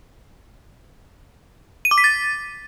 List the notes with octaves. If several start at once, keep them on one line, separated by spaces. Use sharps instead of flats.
D#7
D6
B6
A6